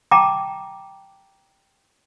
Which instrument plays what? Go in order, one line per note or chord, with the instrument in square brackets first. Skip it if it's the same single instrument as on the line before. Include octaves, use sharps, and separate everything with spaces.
[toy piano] G5 A5 A#5 D6